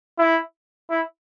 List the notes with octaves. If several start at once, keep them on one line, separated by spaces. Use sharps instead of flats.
E4
E4